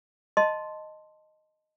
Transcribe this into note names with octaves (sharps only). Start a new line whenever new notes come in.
D#5 A5 C6